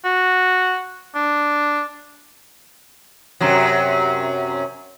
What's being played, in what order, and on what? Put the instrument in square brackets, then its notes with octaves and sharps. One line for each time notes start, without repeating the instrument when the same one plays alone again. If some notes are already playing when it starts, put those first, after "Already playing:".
[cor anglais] F#4
D4
[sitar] F#2 C3 F#3